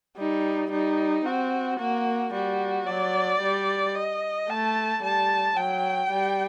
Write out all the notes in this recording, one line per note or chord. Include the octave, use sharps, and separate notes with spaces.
G3 D#4
G3 D#4
C4 F#4
A#3 F#4
G3 F#4
F#3 D5
G3
D#5
A3 A5
G3 A5
F#3 G5
G3